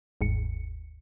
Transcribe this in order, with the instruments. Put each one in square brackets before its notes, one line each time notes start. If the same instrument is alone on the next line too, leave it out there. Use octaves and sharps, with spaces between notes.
[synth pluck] G1 D#2 G#2 C#7